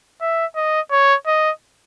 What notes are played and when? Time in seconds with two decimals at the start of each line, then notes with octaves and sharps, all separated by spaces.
0.21 E5
0.56 D#5
0.91 C#5
1.27 D#5